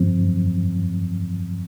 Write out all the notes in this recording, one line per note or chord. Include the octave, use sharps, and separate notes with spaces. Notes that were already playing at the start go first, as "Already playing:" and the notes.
Already playing: G2 F3 C4